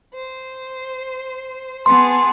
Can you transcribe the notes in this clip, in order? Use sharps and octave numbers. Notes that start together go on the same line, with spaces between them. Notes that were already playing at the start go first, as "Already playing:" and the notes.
C5
B3 G#4 A5 C6